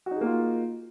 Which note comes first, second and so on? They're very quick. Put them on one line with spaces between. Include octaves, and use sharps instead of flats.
F#4 D#4 G#4 A#3 F4